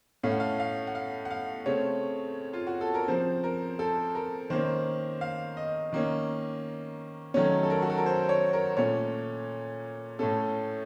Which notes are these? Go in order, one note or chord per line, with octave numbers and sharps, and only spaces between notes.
A2 A3 C#4 F5
F#5
F5
F5
F#5
F5
F#5
F5
C#3 A3 C4 C#5
F4
F#4
A4
A#4
C#3 F3 C4 C5
A#4
A4
A#4
D#3 A#3 C#4 C5
F5
D#5
D#3 A#3 C#4
D#3 F#3 A3 C#4 C#5
A4
A#4
F#4
A4
A#4
C5
C#5
A#4
A#2 A3 C#4 C#5
A2 A3 C#4 A4